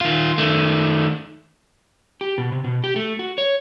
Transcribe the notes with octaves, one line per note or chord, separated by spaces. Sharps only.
D#3 F4
D#3 A3
G4
B2
C3
B2
G4
A3
F#4
C#5